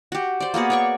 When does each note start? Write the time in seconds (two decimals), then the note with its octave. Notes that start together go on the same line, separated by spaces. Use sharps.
0.12 F#4 G4
0.40 C5 D5
0.54 A#3 B3 F#4 G#4
0.70 C#5 D5 C#6